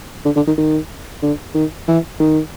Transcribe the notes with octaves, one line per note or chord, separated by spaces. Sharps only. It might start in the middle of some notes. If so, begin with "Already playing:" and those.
D3
D3
D#3
D#3
D3
D#3
E3
D#3